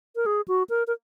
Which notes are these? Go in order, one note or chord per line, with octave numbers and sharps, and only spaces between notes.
A#4
G#4
F#4
A#4
A#4